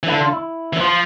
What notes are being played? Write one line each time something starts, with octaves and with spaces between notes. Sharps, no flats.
E3
D3 E4
F4
E4
E3
F3 F4